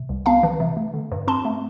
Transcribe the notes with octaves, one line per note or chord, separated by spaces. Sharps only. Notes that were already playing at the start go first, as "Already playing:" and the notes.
Already playing: C3
C2
B3 F5 A5
E3
C3
A3
D3
G2
C4 A5 C6
A3